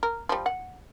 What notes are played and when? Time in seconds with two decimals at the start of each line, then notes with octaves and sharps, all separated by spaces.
0.03 A#4
0.29 F3 G3
0.46 F#5